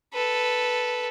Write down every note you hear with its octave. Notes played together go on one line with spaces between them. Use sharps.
A4 B4